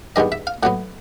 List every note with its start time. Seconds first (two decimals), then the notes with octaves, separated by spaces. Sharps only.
0.16 G2 D#3 G#3 B3 D#5
0.32 E5
0.47 F5
0.63 A2 F#3 B3 F#5